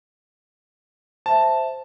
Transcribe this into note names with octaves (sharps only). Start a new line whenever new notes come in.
C5 E5 A5